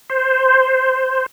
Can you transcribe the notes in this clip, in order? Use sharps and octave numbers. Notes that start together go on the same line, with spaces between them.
C5